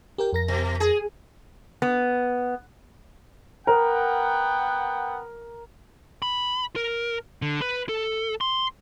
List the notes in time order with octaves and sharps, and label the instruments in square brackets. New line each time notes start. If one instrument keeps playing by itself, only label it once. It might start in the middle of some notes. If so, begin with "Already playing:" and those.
[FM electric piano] G4 A#4 G5
F2 A#4 A#6
[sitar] B2
G#4
[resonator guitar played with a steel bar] B3
[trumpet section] B3 F#5 G5 [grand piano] A#4
[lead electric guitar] B5
A#4
D3
B4
A4
C6